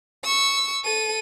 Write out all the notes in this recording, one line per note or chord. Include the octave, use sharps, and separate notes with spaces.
C#6 E6
A4 D#7